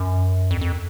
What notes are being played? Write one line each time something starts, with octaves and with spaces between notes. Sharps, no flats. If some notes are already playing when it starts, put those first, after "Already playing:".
Already playing: F#2
F2
F2